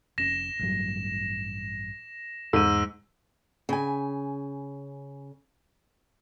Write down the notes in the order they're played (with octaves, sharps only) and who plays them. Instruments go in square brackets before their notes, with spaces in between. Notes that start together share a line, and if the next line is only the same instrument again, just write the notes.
[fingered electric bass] F1 C#4 [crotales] A#6 E7
[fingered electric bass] A1 G2 F#3
[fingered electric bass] E2 [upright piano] G#2 [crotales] E6 D#7
[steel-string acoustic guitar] C#3 G#5